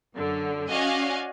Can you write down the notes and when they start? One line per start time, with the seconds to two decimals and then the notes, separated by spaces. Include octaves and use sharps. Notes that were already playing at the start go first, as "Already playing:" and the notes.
0.15 F#2 D3
0.71 C#4 F#4 D5 D#5 F5 G#5